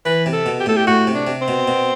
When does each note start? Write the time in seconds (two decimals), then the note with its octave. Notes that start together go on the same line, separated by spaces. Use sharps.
0.05 E3 B4
0.26 C3
0.33 A4
0.46 B2
0.60 G4
0.66 A2 A4
0.76 G4
0.87 A2 F#4
1.07 C3
1.14 D4
1.27 C3
1.41 C4
1.48 B2
1.68 B2